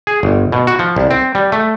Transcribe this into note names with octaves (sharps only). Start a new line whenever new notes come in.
G#4
G1
B2
F#4
F3
C2
C4
G3
A3